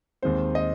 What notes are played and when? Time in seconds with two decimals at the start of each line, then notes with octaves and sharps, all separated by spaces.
0.22 D#2 D#3 G#3 C4 C5
0.55 D#5